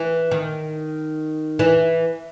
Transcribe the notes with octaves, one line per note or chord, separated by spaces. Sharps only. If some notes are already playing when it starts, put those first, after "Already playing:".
Already playing: E3
D#3
E3